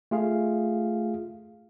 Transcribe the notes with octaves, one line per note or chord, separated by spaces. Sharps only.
A3 F4 G#4 F5